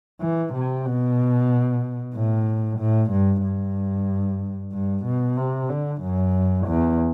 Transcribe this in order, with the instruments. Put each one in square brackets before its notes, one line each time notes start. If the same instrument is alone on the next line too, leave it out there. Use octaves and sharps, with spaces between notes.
[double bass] E3
C3
B2
A2
A2
G2
G2
G2
B2
C3
D3
F#2
E2